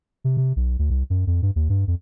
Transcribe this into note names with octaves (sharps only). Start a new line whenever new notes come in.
C3
C3
B1
D2
C2
F#2
F2
G2
D#2
G2
F2